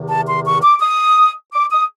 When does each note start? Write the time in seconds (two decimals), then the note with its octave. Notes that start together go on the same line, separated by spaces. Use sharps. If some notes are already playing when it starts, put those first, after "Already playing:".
Already playing: E2 C3 D#3
0.09 A5
0.28 C6
0.46 C#6
0.63 D6
0.81 D#6
1.53 D6
1.72 D#6